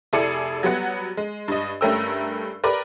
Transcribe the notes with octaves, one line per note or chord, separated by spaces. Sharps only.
F1 E4 G#4 A4 D5 C#7
F#3 G3 B3 F#5
G#3
G2 D#5
G2 A3 C#4 A#4 G5 E6
G4 A#4 B4 D5